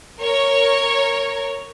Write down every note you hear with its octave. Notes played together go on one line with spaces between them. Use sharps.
A#4 C#5